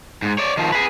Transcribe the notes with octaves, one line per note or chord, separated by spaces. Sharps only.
G#2
C#5 D5
D#3 F3
G#4 B4